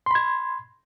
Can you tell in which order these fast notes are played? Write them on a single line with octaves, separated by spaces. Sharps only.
C6 B5 G#6